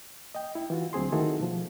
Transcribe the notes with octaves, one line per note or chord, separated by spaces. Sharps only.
D#5 G5
E4
E3 F4 F#4
D2 F#3 C4 G#4 C6
D#3 A3 E4 F#4 G#4 A4
B2 F3